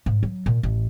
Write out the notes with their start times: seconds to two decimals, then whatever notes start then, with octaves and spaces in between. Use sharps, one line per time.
0.06 G#2
0.23 F#3
0.46 A#2
0.63 A1